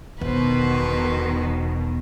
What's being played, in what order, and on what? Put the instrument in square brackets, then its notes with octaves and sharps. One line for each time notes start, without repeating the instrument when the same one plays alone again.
[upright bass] E1 [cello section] B2 D#3 [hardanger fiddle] B4 C5